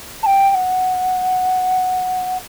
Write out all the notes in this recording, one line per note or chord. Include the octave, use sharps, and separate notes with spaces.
A5
G5
G5
F#5